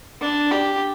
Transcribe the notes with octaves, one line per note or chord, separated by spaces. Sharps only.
D4
G4